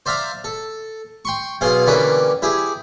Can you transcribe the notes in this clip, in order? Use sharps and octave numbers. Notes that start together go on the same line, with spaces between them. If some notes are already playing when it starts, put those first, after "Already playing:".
C5 D5 E5 F5 A#5
A4
G5 C6 C#6
B1 B2 G#4 F5 C6
D3 E3 G3 A#3 C#4 B4
E4 G4 G#4